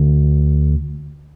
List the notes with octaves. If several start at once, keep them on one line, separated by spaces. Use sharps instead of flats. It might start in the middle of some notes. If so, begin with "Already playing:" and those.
Already playing: D2